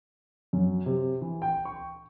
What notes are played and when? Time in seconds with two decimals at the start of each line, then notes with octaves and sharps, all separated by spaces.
0.53 F#2
0.86 C3
1.22 E3
1.42 G5
1.65 C#6